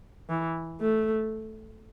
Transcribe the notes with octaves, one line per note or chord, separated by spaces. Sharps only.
E3
A3